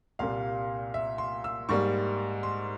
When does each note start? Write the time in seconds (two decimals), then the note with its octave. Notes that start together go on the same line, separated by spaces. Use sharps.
0.19 C2 A#2 G3 A#3 F5
0.94 E5
1.18 C6
1.44 E6
1.69 G#2 G3 A#3 C#6
2.43 C6